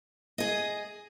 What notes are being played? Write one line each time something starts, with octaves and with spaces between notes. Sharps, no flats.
G#4 D#5